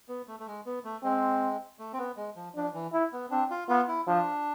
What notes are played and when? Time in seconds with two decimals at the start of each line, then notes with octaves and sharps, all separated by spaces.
0.09 B3
0.28 A3
0.40 A3
0.48 G#3
0.66 B3
0.84 A3
1.03 G#3 C4
1.79 A3
1.93 C4
1.98 B3
2.17 G#3
2.36 F3
2.56 F3 D4
2.74 E3
2.93 E4
3.13 B3
3.31 C4 D4
3.51 F4
3.68 B3 F4
3.88 E4
4.07 F3 D4